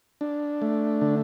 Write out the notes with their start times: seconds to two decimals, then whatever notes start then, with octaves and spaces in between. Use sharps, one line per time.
0.21 D4
0.62 A3
1.01 D3